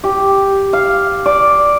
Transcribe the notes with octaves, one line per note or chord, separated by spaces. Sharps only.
G4
F5
D5